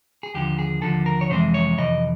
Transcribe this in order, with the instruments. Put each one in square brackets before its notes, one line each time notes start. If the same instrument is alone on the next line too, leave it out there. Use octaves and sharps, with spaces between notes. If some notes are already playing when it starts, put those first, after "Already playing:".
[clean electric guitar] G#4
D#2 D3 F3 G4
G#4
D#2 D3 F3 A4
A#4
C#5
F2 C3 E3 G#3 C5
C#5
F2 C3 E3 D#5